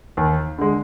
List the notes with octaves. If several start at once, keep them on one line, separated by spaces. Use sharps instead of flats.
D#2
D3 G#3